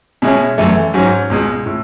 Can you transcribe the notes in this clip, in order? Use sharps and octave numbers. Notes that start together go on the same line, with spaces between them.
B2 G#3 C#4 E4
F#2 E3 A3
G#2 F#3 C#4
C#2 B2 G#3
A2